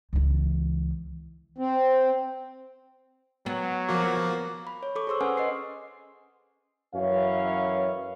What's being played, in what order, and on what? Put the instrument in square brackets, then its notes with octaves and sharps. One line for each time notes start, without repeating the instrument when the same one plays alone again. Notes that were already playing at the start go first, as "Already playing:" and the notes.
[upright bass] C#2 E3
[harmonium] C4
[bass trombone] F#3 [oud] B3
[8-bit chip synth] F3 F#4 [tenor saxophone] A#3
[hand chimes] B5
C#5
A4 C#6 D6
G#4 C5 C6 C#6 E6
C#4 B4 F#5 G#5 D#6 F6
D#5 C6 C7
[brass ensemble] F#2 E3 C#4 F5